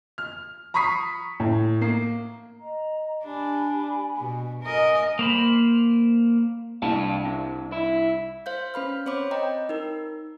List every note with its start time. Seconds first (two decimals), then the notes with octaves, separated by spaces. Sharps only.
0.18 F6
0.74 A#5 B5 C#6 D#6 B6 C7
1.40 A2
1.81 A#3 C7
2.58 D#5 A#5
3.24 D4 G4 G#5 B5
4.17 B2
4.63 A#4 D#5 G#5
5.19 A#3 C5 B5
6.82 C2 D4 F5 G5 A5
7.25 C3
7.72 E4
8.46 C5 F5 G6
8.74 C#4 B4 B5 F6
9.06 C4 C5 C#5 B5 D6
9.31 D#5 G5 A#5
9.69 D#4 A#4